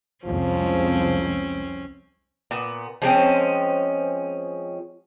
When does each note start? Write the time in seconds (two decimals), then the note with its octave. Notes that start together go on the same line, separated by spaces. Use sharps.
0.25 C2 F2 F3 G#3 C4 C#4
2.51 A#2 B3
3.02 F3 G#3 C4 C#4